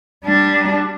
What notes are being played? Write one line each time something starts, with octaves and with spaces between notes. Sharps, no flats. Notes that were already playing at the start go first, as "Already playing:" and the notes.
G3 D4